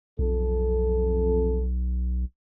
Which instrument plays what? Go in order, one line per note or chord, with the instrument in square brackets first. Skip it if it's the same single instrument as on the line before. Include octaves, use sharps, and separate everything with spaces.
[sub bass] B1 [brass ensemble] F2 A4